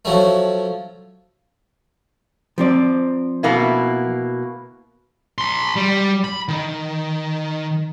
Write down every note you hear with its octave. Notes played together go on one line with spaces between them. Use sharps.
F3 F#3 A3
F3 C4 D5
B2 A#3 E4
B5 C6
G3
B5
D#3